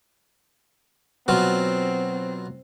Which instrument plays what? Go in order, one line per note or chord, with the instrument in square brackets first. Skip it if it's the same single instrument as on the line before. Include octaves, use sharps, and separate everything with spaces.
[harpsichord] B2 F#3 F4 [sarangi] C4